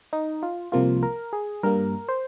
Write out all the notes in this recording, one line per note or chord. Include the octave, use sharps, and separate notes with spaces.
D#4
F4
C2 C3 F3 A#3 F4
A#4
G#4
G2 G3 A#3 A#4
C5